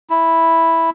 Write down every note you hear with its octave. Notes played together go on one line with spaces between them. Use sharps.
E4